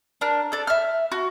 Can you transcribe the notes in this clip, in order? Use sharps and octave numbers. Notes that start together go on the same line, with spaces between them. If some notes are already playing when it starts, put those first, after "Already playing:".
D4 A#4
A4 D5
E5 F6
F#4